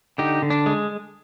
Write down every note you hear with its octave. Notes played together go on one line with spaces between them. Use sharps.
D3 D#4 G4
D3
D4
G#3